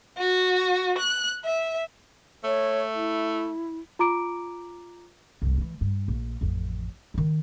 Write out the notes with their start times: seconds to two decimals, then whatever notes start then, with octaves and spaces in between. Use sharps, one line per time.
0.18 F#4
0.98 F#6
1.44 E5
2.44 A3 C#5
2.94 E4
3.99 F4 A#5 D6 D7
5.42 C2 G2
5.58 E3 F#3
5.81 G2
6.08 A#1
6.41 A1 F2
7.14 D#3 E4